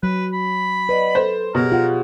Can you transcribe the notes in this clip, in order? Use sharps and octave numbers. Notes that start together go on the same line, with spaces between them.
F#3 B4
B5
B4 D5 D#5 F#5
A4 C5
B2 G4 G#4 A#4 C#5
F4 F#5